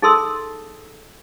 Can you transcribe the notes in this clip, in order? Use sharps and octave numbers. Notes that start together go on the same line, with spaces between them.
D#4 G#4 A4 C6 E6